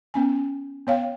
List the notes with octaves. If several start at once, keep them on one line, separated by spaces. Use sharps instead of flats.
B3 C#4 G#5
B3 C#5 F5 G5